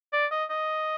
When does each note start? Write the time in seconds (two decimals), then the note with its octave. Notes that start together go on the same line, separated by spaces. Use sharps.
0.13 D5
0.31 D#5
0.50 D#5